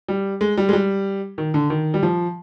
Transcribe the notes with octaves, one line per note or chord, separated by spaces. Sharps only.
G3
G#3
G3
G#3
G3
D#3
D3
D#3
G3
F3